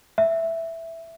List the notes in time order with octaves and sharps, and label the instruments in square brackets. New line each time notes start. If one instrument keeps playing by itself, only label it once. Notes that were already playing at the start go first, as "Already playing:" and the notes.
[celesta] E5